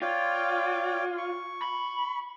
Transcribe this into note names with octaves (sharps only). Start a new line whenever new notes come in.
F4 C#5 D5 G5
C#6
B5